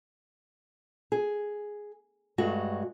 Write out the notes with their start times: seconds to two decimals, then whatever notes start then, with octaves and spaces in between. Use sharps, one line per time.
1.12 G#4
2.38 G2 G#3 A3 F#4